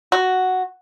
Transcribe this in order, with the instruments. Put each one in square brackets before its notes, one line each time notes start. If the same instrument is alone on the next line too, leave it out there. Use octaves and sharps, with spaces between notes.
[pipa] F#4